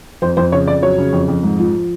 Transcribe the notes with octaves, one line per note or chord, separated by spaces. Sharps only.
F2 C5
F2 C5
C#3 C#5
F2 D5
F#3 C#5
C#3
F2
F2
G#2
F3